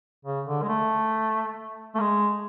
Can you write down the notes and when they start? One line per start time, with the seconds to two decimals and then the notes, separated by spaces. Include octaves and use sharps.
0.25 C#3
0.47 D3
0.62 G#3
0.69 A3
1.95 A3
2.00 G#3